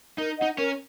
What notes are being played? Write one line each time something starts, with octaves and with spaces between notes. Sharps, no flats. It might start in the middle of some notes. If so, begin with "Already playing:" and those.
D#4 A#4
D#4 D#5 F#5
C#4 A#4